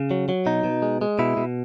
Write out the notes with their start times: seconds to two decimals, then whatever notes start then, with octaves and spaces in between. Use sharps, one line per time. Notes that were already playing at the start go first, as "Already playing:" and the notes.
Already playing: C#3
0.11 F#3
0.29 F#3
0.46 B2 D#4
0.64 B2
0.82 G#3
1.01 G#3
1.19 B2 E4
1.37 B2